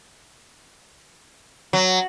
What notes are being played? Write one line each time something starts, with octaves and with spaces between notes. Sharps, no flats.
F#3